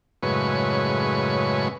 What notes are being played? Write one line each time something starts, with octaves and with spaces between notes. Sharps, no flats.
F#2 A2 C#3 G#3 B4 C#6